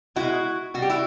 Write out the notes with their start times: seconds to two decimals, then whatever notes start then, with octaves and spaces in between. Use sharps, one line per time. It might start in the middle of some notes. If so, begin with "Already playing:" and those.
0.16 B2 G#3 E4 F#4
0.74 B2 F#4
0.78 G3 G4
0.90 E4 F#4